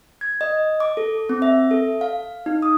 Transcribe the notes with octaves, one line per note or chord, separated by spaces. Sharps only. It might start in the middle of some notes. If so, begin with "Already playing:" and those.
G#6
D#5
D6
A4
C4
E5
A4
F5
D#4
D#6